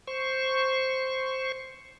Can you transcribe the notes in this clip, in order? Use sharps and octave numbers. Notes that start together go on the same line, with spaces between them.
C5 C#6